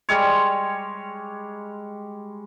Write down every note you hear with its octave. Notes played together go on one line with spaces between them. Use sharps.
G3 G#3 C#5